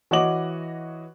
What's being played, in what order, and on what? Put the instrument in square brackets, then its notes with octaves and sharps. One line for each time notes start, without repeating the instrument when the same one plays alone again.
[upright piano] E3 F#4 C#5 D#5 D6 F#7